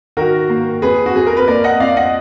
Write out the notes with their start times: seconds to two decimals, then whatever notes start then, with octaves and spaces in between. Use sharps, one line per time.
0.17 D#3 F#4 A#4
0.49 A#3
0.82 F2 G#4 B4
1.06 F#4
1.15 F2 G#4
1.26 A#4
1.37 B4
1.47 A#3 A#4 D5
1.64 D#5 F#5
1.80 F2 D5 F5
1.97 D#5 F#5